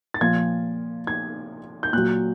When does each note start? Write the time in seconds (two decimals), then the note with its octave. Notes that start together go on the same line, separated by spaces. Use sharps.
0.14 A6
0.21 A#2 F3 G#6
1.07 G#6
1.83 G6
1.93 A#2 F#3 F#6